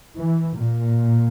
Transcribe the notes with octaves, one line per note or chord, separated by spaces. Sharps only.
E3
A#2